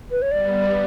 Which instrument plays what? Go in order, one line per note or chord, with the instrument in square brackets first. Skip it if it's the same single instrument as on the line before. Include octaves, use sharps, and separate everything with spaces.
[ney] B4
C#5
[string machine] G3 B3 [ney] D5